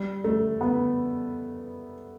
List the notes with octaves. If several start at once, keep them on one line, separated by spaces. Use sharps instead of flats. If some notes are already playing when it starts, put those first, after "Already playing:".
Already playing: G3
A3
B3